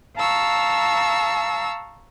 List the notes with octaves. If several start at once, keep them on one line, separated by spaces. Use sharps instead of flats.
F5 A5 A#5 C#6 E6